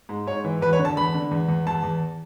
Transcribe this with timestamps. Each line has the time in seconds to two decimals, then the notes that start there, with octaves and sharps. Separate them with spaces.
0.09 G#2
0.27 G#2 C#5
0.44 E3
0.62 E2 B4
0.73 C#5
0.79 D3
0.85 A5
0.97 E2 B5
1.15 D3
1.31 E2
1.49 E2
1.67 E2 A5
1.83 E2